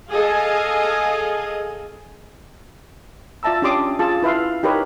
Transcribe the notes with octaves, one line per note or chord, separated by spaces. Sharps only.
G#4 A4 D#5 F5 G#5
F4 D5 E5 A5 A#5 E6
C#4 D4 G4 C6 D6 D#6
F4 G#4 A5
E4 B4 E5 F5 C6
D#4 G4 A#4 B4 C#5